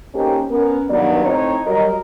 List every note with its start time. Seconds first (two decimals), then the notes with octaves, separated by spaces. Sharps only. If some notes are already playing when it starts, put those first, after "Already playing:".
0.14 A#3 C#4 D#4 G4 A4 C5
0.50 B3 C#4 A#4
0.90 G2 D#3 F#3 B3 D5
1.24 A2 C4 D#4 C#5
1.65 F#3 G3 A#4 D#5